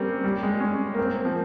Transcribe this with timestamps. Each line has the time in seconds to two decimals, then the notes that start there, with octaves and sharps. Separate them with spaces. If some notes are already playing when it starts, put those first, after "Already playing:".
Already playing: G3 A#3 C4 C#4
0.24 G3
0.43 G#3
0.60 C#4
0.94 A#3
0.99 C4
1.25 F3